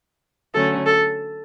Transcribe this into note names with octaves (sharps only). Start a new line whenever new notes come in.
D3 F#3 A3 C#4 A4
A4